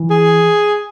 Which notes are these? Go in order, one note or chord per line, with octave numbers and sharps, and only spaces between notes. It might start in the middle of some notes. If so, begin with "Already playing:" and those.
Already playing: E3
G#4